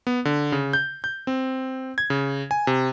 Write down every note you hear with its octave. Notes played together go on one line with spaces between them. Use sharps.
B3
D3
C#3
G6
G6
C4
G#6
C#3
G#5
C3